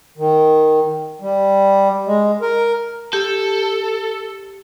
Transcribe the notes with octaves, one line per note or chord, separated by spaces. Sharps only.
D#3
G3
G#3
A#4
G4 A4